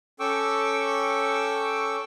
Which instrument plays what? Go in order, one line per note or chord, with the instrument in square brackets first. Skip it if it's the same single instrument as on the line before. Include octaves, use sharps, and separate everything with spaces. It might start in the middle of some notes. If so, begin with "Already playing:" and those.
[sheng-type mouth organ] C#4 A4 G5 C#6 D6 E6